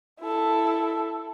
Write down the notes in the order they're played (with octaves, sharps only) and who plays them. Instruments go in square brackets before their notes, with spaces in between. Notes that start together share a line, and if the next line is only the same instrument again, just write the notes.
[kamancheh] E4 A4